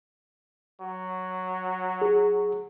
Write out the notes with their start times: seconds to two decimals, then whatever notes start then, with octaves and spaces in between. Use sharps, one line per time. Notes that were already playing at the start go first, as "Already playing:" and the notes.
0.81 F#3
2.02 G#4